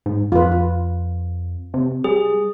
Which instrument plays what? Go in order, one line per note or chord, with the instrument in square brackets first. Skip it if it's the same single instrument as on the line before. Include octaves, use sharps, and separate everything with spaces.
[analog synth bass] G#2
[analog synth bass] F2 [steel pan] F4 B4
[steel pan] F4
[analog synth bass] C3
[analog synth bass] G3 [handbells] G#4